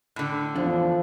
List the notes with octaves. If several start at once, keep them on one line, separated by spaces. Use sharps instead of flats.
A2 D3
E2 F3 D4